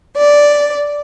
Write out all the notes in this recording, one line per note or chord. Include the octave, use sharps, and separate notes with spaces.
D5